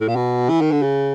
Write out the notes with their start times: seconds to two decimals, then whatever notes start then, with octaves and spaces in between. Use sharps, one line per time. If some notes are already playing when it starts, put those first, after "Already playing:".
0.01 A2
0.08 A#2
0.16 B2
0.50 E3
0.61 D#3
0.72 D3
0.83 C#3